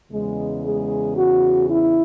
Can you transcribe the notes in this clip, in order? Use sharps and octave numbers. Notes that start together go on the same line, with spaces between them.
E2 C#3 G#3
G#3 G#4
F#4
E4